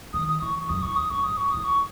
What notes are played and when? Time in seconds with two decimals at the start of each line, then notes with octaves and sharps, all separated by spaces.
0.13 D#3 D#6
0.28 D#6
0.42 E3 C#6
0.56 C#6
0.69 F#2 D#6
0.82 E2 C#6
0.96 E2 D#6
1.10 F#2 C#6
1.23 G#2 D#6
1.37 C#6
1.51 E2 D#6
1.64 C#6